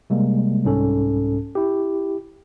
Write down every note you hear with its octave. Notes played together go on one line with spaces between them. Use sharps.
C3 G3 G#3 A#3
C2 G#2 C#4 A4
E4 G4